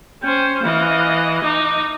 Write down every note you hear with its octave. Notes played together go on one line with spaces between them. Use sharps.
C#4 C5 G5
E3 D#5 F5
D#4 D6